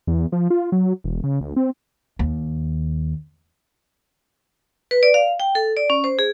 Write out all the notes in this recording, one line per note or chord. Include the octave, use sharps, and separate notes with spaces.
E2
F3
F4
F#3
E1
C#3
D2
C4
D#2
B4
D5
F5
G5
A4
D5
C#4
C5
G#4